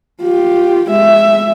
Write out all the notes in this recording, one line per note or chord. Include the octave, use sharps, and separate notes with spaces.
F4 G4
G#3 E5